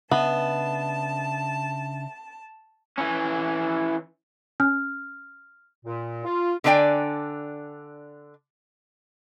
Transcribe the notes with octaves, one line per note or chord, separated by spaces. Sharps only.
C#3 B3 D4 D#5 E5 A5
E3 C#4
C#4 F6
A#2
F4
D3 B3 D4 D5 G5 G#5